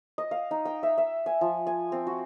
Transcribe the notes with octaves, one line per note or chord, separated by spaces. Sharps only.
D#5
F5
D#4
G5
E5
E5
G#5
F3
G#5
C4
F#4